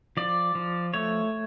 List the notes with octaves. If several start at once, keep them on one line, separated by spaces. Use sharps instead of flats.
F3 D5
F3
A3 C#5